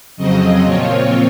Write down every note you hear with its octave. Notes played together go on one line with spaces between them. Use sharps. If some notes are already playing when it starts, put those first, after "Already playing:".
F2 C#3 F#3 C4 D#5
A#2 F3 C4 F4 C#5